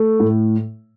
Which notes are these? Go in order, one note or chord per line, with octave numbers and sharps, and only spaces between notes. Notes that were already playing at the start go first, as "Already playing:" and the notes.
Already playing: A3
A2